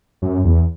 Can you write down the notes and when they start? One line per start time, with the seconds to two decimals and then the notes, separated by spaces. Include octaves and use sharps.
0.22 F#2
0.44 E2